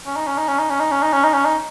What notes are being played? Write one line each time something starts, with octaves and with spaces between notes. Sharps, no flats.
C#4
D#4
C#4
D#4
C#4
D#4
C#4
D#4
C#4
D#4
C#4
D#4
C#4
D#4